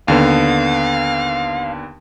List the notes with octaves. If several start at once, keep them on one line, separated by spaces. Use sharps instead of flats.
D#2 D3 B3 F5